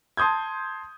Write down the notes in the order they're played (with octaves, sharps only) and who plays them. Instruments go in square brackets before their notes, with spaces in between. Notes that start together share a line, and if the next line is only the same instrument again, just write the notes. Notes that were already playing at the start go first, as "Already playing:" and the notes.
[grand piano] A5 C6 D#6 G6 G#6